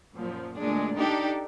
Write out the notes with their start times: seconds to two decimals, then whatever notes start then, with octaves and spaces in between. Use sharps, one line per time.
0.14 F#2 A#2 F3
0.56 D2 A#2 G#3 D4
0.96 D4 D#4 G4 A4